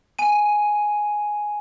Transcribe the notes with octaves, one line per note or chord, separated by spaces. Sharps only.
G#5 D#7